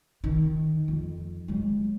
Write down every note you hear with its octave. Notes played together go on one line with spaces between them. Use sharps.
D#3
F2
F#3 G#3